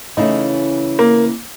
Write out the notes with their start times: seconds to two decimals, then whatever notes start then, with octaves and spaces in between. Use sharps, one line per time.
0.17 C#3 E3 A3 C#4 D#4 E4
0.99 A#3